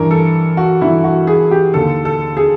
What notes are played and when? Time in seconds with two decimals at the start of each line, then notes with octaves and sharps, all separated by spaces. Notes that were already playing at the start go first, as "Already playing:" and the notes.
Already playing: G2 E3 A#4
0.11 A4
0.57 F#4
0.81 G2 E3 E4
1.04 F#4
1.27 G#4
1.51 G4
1.74 D#2 D3 A4
2.05 A4
2.37 G#4